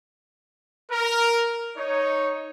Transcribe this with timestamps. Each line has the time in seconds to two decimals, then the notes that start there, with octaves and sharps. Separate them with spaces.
0.91 A#4
1.77 D#4 C#5